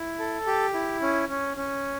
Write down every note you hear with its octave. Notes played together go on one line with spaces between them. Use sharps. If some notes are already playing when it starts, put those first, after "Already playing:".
Already playing: E4
A4
G4
E4
C#4
C#4
C#4